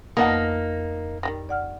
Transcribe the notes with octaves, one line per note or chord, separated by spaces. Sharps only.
F2 A#3 B3 D#4 A#4 F#5 A5 D#6
D#3 F#3 G3 A#6
D5 F#5 F6